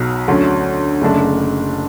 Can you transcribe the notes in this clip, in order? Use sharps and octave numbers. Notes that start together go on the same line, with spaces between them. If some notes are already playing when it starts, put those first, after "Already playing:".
Already playing: B1 B2 F#3
D2 D3 F#3 C#4
F#1 F#2 D3 A3 D4